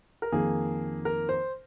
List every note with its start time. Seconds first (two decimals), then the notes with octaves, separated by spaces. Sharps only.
0.22 A#4
0.32 F2 D#3 A#3 G#4
1.05 A#4
1.29 C5